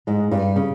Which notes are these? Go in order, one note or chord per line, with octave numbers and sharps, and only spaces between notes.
G#2 G#3
G2 G3
C#3